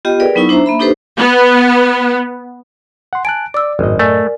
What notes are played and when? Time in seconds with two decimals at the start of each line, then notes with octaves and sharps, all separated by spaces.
0.05 B3 F4 G4 D#5 G5
0.20 G#4 A#4 B4 D5 F5 G5
0.35 F#3 B3 D#4 E4 C#6 E6
0.49 D4 C5 E5 A#5
0.66 A#3 E5 B5
0.80 D4 D#4 G4 A4 B4 C5
1.18 B3
3.13 F#5 C6
3.25 G#5 A5 F#6 D7
3.54 D5 D6 E6
3.79 G#1 F#2 A2 D#5
3.99 A3 A#4 D5 G#5